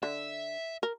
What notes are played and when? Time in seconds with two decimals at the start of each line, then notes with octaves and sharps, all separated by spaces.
0.03 D3 E5
0.83 A#4